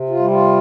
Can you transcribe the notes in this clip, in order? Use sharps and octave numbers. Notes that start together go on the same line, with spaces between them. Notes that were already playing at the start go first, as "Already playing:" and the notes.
Already playing: C3
F4
G3
F4